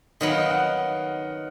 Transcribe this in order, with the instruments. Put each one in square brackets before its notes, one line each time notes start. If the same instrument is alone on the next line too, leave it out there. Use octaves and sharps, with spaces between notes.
[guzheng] D#3 F#3 B3 [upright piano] D#5
[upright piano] F5
D#5
F#5